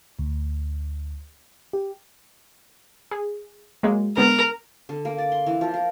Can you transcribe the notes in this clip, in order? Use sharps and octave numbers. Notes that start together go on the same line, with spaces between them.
D2
G4
G#4
F#3 G#3 A#3
D3 G#3 B3 A#4
D3
A#3
D5
C6
E3
F3
A#4